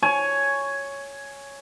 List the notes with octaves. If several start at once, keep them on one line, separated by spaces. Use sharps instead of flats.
C#5 G#5